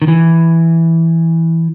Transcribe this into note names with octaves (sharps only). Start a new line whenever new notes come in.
D#3
E3